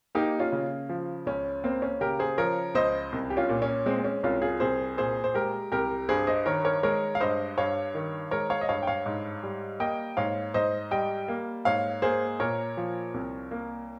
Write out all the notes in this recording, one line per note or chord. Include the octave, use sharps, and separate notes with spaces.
A#3 D#4 G4
C#4 F4
C#3
F3
C#2 C#4
A#3 C4
C#4
C#3 G4 A#4
G#4 C5
F3 A#4 C#5
C#2 C5 D#5
C2
G4
C#4 F4
A#2
C#4
G#3 C4
C4
C#4
C2 C#4 F4
F4 G#4
C2 G#4 C5
A#2 G#4 C5
C5
G#3 G4 A#4
C2 G4 A#4
G2 G#4 C5
C5 D#5
D#3 A#4 C#5
A#4 C#5
G#3 A#4 C#5
F5
G2 C5 D#5
G2 C#5 F5
D#3
G#3 A#4 C#5
C#5 F5
D#5
G2 C#5 F5
G5
C#5 F5
G#2
G3
A#3 D#5 G5
G#2 C#5 F5
G#2 C5 D#5
G3 D#5 G5
A#3
G#2 C#5 F5
A#3 G#4 C5
A#2 A#4 C#5
F3
C2
A#3